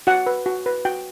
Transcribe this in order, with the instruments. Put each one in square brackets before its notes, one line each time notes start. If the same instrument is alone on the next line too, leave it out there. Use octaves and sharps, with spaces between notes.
[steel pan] F#4 F#5
B4
F#4
B4
F#4 G5